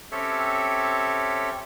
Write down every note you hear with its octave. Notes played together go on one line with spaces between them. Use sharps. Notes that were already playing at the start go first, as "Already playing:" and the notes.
C4 C#4 G4 A4 C#5 E5